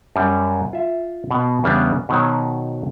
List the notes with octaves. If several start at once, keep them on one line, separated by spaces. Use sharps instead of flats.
F#2 G3
F4 E5
B2 B3
E2 C#3 G3 B3 C#4 D4
B2 D#3 F#3 C5 C#5